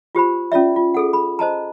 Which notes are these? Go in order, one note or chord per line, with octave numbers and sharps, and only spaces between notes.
F4 G4 C5 B5
C#4 F4 D5 E5
F4
G#4 A4 F#5
B5
C5 D#5 A5 A#5